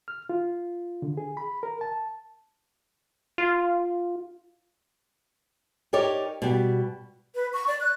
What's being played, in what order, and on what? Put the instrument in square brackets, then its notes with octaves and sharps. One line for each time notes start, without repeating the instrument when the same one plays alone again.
[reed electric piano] F6
F4
D3
G#4
B5
A#4
A5
[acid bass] F4
[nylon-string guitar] D#4 G4 A#4 C#5 D5
B2 G3
[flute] B4
C#6
D5
F#6